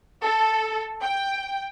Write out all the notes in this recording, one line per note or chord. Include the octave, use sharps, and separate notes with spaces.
A4
G5